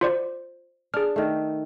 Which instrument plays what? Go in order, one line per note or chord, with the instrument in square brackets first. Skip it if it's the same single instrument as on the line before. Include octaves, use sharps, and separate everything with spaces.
[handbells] F4 C5 D5
[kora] D4 [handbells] G#4 F6
[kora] D#3 A3